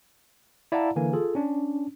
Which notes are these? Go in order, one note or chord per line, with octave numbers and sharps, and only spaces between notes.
E4 D5 F5 F#5 A5 A#5
D3 E3 A#3 G#5
F4 G#4 A4
C#4 D4